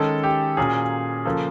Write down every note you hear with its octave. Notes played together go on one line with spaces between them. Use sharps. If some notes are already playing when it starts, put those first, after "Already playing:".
Already playing: D#3 G#3 C#4 A4
G4
A#2 F#3 A#3 C#4 G#4
C#3 F3 A#3 A4